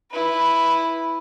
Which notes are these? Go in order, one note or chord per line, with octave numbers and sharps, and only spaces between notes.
E4 B4